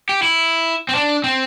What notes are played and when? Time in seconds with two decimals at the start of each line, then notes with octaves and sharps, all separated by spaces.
0.09 G4
0.22 E4
0.89 C4
0.95 D4
1.24 C4